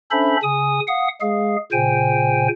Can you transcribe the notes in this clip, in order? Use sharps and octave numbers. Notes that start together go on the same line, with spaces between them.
C#4 D4 A4 C5 E5 B5
C#3 G#5 D#6
F5 F#5 D#6
G#3 G#4 F5
A#2 C#3 C5 G5 G#5